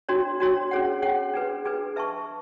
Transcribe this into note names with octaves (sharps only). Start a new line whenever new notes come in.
D4 F#4 C#5
D4 F#4 C#5
C#4 G#4 C#5 F#5
C#4 G#4 C#5 F#5
D4 G#4 B4
D4 G#4 B4
B4 E5 A5 C#6